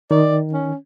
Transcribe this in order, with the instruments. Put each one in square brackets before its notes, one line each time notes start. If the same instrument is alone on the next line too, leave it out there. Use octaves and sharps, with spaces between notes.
[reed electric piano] D#3 [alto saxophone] D5
[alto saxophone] C#4